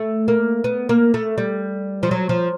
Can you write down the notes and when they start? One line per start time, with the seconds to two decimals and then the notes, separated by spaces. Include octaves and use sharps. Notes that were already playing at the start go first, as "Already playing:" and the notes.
Already playing: A3
0.28 A#3
0.64 B3
0.89 A#3
1.14 A3
1.38 G3
2.03 F3
2.11 F#3
2.29 F3